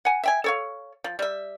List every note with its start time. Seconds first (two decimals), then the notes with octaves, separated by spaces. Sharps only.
0.05 F#5 G#5
0.23 E5 G5 G#5
0.44 A4 C#5 F5
1.04 F3
1.19 G3 E5